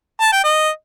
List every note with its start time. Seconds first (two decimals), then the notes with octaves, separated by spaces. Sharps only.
0.21 A5
0.32 G5
0.44 D#5